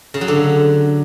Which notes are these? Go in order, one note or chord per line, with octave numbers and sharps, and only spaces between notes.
C#3
F#3
D3